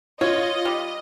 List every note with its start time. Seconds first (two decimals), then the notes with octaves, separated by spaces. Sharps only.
0.21 F4 C#5 D#5
0.65 G3